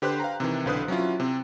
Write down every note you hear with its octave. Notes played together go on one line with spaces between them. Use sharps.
D3 G4 B4 C5 C6 F#6
F5 G5 A#5
C3 D#3 E3
B1 D3 B4 C5 D#6 F#6
F#3 C#4 E4 F4
C3 C4